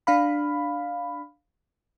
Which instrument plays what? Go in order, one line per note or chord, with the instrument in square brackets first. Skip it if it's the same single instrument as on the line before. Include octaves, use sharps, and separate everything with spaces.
[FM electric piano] D4 F5 B5